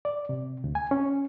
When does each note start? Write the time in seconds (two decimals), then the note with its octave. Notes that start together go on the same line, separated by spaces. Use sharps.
0.05 D5
0.29 C3
0.64 D2
0.75 G#5
0.91 C#4